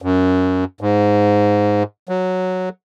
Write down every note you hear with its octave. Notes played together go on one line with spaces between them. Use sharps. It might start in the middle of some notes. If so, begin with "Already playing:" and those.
F#2
G#2
F#3